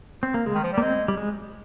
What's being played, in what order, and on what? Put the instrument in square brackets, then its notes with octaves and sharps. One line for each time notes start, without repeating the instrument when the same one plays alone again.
[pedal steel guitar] C4
A#3
[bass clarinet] C#3 [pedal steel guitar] G#3
[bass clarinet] D#3
F3
G3
[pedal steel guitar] A#3
[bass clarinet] G#3 [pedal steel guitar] C4
[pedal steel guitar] G3
G#3